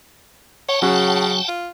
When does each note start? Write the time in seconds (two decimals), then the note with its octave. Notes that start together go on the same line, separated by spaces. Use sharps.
0.69 C#5 F#5 G5 A5
0.82 C#3 F#3 C#4 F#4
1.48 F4